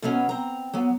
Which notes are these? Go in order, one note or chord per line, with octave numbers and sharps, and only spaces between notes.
B2 F#3 B3 C#4
C4 A#5
F#3 B3